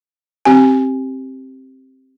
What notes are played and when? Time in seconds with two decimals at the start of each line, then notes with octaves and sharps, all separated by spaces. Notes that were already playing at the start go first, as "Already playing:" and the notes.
0.45 C4 G4 G#5